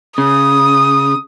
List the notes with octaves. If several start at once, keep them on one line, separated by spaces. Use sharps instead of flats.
C#3 D#6